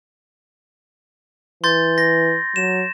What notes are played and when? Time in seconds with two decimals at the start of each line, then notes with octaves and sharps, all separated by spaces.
1.64 E3 C6 G6 A6
1.98 A#6
2.56 F#3 E7